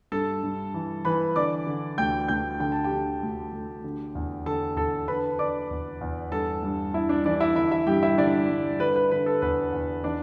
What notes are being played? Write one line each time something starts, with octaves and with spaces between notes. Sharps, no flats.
G2 A4 A5
G2
E3
E3 B4 B5
D3 D5 D6
D3
D2 G5 G6
D2 G5 G6
D3 G5
A5
G4 G5
D3
D2
D2
D3
E2
D3 A4 A5
E2 A4 A5
D3 B4 B5
D3 D5 D6
E2
E2
G2 A4 A5
G2
G2 E4 E5
D4 D5
E3 D4 D5
E4 E5
D3 E4 E5
E4 E5
G2 G4 G5
E4 E5
D3 D4 D5
G2
D3 B4
B4
D3 B4
A4
E2 B4
E2
E3 D4 D5